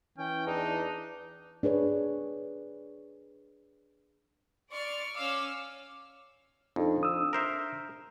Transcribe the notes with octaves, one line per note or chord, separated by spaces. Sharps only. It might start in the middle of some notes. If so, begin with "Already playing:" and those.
E3 C#4 G5
E2 D4 D#4
D4 G#4 B4 C#5
D5 C6 C#6 F6
C#4 F5 D6 E6 F6
F2 D4 D#4 A4
D4 D#6 E6
A#4 C5 E5